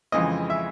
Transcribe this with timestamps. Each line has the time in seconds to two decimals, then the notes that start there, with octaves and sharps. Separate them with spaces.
0.12 F2 C#3 E3 G#3 D#5
0.50 E5